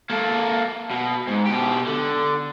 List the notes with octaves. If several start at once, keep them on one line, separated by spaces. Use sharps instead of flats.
A#3 A4
B2
G#2
B2 G4
D3